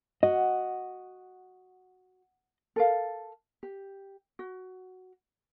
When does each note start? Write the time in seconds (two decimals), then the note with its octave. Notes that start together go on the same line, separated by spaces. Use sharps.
0.23 F#4 D#5
2.76 A4 A#4 F5
3.63 G4
4.39 F#4